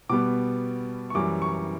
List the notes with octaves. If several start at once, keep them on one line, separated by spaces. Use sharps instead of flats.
B2 G3 B3 D6
C#6
F#2 E3 G3 D6
C#6